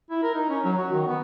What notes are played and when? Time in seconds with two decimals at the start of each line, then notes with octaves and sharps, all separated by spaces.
0.10 E4
0.23 A#4
0.34 D#4
0.50 C#4
0.65 F#3
0.78 F#4
0.92 D#3
1.07 B3